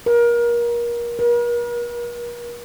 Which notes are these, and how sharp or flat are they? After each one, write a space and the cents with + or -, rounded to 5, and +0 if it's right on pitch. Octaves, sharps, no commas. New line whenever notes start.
A#4 +30
A#4 +45